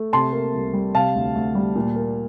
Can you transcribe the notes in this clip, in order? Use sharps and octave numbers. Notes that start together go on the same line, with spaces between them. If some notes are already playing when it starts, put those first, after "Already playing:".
Already playing: A3
C3 A5 C6
A#3
C2
G3
C3 F5 A5
D2
D2
G3
A#2
A#3